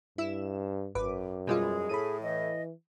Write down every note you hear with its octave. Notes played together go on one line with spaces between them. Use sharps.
G2 E4 E5 E7
G#1 F#2 B4 D6
E2 B2 G3 G#3 F4 G#4
A2 B5 D#7
E3 D#5